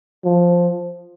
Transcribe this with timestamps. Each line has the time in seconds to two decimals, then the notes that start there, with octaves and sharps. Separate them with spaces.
0.25 F3